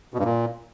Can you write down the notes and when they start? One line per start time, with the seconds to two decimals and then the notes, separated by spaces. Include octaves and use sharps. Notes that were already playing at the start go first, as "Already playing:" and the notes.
0.14 B2
0.19 G2
0.25 A#2